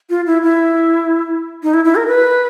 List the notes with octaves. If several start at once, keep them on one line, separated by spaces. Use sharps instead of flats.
F4
E4
E4
D#4
E4
E4
A#4
B4